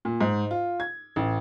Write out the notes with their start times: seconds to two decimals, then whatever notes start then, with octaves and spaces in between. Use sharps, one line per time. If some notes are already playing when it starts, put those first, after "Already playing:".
0.05 A#2
0.21 G#2
0.51 F4
0.80 G#6
1.16 A1